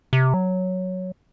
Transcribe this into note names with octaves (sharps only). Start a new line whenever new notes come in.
C3
F#3